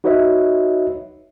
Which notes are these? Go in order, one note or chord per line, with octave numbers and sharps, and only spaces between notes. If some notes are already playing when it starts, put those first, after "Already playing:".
D#4 F#4 B4 C#5 D#5 E5